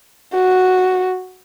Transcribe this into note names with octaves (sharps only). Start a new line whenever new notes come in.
F#4